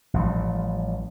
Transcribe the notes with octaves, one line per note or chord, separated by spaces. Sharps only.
A1 F3 G3